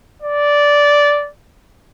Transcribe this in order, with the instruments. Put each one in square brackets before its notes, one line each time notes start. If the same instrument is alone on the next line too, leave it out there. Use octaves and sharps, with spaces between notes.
[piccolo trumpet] D5